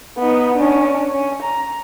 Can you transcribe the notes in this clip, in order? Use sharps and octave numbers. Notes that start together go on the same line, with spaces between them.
B3 D#4
C#4 D4
C#4
A#5